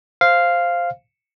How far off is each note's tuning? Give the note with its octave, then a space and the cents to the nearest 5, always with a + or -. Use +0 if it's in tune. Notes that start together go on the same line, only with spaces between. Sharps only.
C5 +0 F5 -5